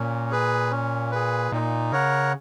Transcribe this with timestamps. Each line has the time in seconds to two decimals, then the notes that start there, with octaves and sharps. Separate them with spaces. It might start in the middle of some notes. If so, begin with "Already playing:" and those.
Already playing: A#2 C#4
0.31 G#4 B4
0.71 C#4
1.11 G#4 B4
1.52 A#2 D#4
1.92 C#3 A#4 C#5 F#5